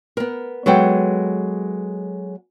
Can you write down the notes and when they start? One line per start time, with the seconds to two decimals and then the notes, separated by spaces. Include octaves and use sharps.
0.17 B3 A#4
0.66 F#3 G#3 B3 A4 F#5 G5